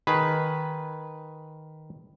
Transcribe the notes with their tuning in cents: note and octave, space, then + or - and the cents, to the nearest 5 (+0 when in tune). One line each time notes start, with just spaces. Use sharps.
D#3 +0 G#4 +0 B4 +0